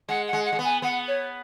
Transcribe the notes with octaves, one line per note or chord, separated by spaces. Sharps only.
G#3 F#5
F#5
G#3
F#5
G#3
B3
G#5
B3 F#5
C#5